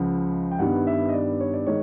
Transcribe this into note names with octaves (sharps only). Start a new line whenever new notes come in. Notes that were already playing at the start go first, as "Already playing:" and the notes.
Already playing: C#2 C#3 F3 F#5
G5
G2 D#3 G3 B3 F#5
E5
D#5
D5
C#5
D5
D#3 G#3 C#5